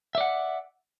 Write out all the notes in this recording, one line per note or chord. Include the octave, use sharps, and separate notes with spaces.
D5 E5 F#5